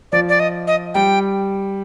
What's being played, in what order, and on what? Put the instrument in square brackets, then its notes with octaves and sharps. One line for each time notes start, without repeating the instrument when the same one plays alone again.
[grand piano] F3 [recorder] D5
[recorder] D5
D#5
D#5
[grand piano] G3 [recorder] G5